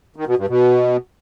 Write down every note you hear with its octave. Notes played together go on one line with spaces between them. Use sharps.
D#3
B2
G2
B2